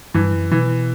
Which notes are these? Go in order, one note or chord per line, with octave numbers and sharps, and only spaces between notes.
G2 E3
F#2
B2 E3